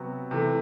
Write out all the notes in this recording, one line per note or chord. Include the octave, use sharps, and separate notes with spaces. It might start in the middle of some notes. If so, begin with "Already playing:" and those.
Already playing: C3 F#3 B3 F#4
C3 E3 A3